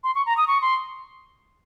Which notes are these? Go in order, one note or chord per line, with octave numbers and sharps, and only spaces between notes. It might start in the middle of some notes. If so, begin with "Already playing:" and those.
C6
C#6
A#5
D#6
C#6
C6